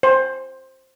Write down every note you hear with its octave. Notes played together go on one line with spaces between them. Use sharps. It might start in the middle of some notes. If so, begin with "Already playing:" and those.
C5